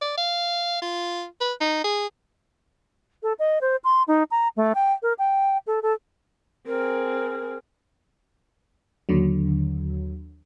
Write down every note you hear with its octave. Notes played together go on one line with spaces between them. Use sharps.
D5
F5
F4
B4
D#4
G#4
A4
D#5
C5
C6
D#4
A#5
A3
G5
A#4
G5
A4
A4
C4 G#4 A#4
D#2 D3 F#3